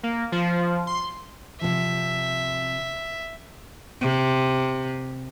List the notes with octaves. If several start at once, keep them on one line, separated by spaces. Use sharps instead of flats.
A#3
F3
C6
C3 F3 E5
C3